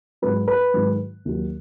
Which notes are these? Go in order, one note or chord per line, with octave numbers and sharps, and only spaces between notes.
G#2 F#3 B4
B4
G#2 D#3 F#3
D#2 D#3 F#3